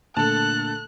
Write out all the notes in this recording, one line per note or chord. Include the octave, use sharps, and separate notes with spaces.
A#2 D3 A3 A4 A5 F#6